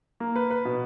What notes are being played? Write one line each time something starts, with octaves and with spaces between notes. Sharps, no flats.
A#3
B4
B4
B2